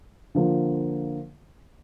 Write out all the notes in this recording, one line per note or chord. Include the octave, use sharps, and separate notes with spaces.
D3 F3 A#3